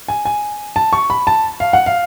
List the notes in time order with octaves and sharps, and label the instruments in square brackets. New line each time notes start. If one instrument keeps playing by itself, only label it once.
[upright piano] G#5
G#5
A5
C#6
B5
A5
F5
F#5
F5